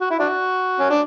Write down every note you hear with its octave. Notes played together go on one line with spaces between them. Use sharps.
F#4
E4
D4 F#4
C#4
D4